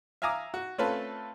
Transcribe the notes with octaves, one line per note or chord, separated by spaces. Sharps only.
E5 F5 G#5 A#5 D6 D#6
F#4
A3 C4 C#4 F4 A4 B4